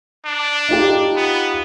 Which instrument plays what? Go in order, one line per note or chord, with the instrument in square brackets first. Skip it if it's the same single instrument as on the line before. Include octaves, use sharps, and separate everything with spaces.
[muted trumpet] D4
[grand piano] D#4 F4 G4
[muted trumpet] B3